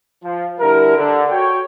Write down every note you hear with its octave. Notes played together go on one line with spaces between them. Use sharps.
F3
D3 G3 E4 A#4
D3
F#4 C#5 G5